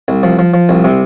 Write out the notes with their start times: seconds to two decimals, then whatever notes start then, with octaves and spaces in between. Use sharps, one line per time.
0.08 C2
0.23 F3
0.39 F3
0.54 F3
0.69 C2
0.84 C3